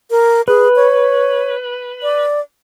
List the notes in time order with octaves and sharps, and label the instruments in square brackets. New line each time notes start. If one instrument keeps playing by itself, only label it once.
[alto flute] A#4
[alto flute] G#4 [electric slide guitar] B4
[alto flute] C#5
D5